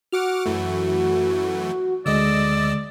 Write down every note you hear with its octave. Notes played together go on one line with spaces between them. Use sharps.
F#4 F#5 D6 F6
F#2 E3 A3
D2 D3 G#3 D5 D#5 E6